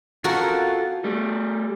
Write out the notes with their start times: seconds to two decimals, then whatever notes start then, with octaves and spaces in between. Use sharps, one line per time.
0.24 F4 F#4 A4 A#4
1.04 G3 A3